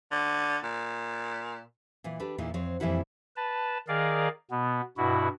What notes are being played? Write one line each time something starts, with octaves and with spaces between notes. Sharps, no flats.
D3
A#2
A#2 E3
D4 G4 A4 B4
E2 A#2 E3 D#4
F2 C4 C#5
F2 A#2 E3 G3 E4 F#5
B4 A5
D#3 G#4 A#4 D5 F5
B2 B3
G2 B2 E4 F#4